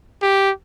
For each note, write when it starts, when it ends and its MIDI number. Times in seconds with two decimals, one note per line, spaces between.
0.22 0.50 67